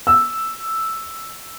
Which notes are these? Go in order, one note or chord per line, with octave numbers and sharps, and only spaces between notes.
E6